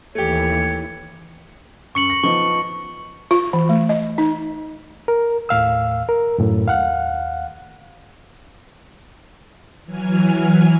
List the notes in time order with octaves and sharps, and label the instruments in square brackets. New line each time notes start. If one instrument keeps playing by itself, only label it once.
[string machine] D#2 E3 [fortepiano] A3 G4 [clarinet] C#5
[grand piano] F#2 [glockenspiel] C#6 C#7 F#7
[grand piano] A#6
[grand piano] F3 B3 D#4 [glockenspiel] C#6
[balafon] F4
E3
A3
D#5
D#4
[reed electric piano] A#4
D#2 A2 F5 E6
A#4
F#2 A2
D#2 F5 F#5
[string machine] E3 F#3 G#5 F6